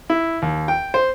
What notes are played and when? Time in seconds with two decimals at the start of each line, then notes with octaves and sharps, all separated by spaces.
0.10 E4
0.42 D#2
0.68 G5
0.94 C5